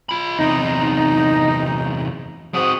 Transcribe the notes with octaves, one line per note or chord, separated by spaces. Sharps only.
F4 B5
E2 C3 D#4
G#2 C4 F#4 D#6